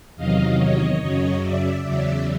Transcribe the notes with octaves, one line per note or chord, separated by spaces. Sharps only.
E2 C3 D#3 F#3 D#5 F5
C#5 D#5
F#2 C#3 F#3 C#5 D#5
D5 E5
E2 C#3 F#3 D5 E5